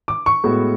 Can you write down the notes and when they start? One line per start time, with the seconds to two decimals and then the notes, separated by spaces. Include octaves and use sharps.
0.08 D6
0.26 C#6
0.44 A2 G#3 B3 F#4